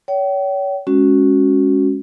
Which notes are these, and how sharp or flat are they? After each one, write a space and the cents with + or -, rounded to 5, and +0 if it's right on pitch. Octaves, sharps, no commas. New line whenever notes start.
C#5 +30 G5 -40
G#3 +0 C#4 +0 F#4 +0